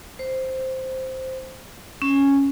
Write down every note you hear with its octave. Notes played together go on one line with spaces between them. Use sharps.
C5
C#4